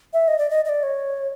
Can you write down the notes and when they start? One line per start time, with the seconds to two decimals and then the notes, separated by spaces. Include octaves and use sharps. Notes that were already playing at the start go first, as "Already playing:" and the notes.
0.13 E5
0.28 D#5
0.39 D5
0.50 D#5
0.65 D#5
0.69 D5
0.83 C#5